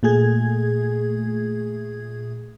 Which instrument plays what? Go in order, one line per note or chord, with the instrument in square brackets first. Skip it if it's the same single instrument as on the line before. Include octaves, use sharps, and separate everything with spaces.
[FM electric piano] A#2 A3 G#4 G#6